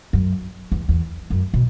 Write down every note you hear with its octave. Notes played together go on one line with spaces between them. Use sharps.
F#2
E2
E2
F#2
B2